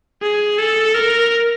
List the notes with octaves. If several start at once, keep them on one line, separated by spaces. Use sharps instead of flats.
G#4
A4
A#4